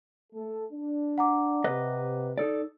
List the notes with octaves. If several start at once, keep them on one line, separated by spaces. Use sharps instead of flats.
A3 A4
D4
F#5 A#5 D6
C3 B4 D#5
D#4 A4 D5